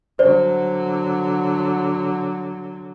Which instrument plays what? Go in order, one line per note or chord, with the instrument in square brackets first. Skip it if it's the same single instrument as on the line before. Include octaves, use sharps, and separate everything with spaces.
[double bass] D3 F#3 [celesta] C5 D5